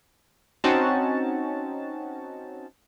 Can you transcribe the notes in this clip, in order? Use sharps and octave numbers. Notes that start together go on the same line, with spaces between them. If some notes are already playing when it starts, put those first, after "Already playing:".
C4 C#4 D#4 F#4 A5